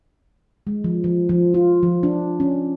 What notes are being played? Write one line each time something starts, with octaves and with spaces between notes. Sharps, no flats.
G#3
F3
F3
F3
F4
F3
D4
C#4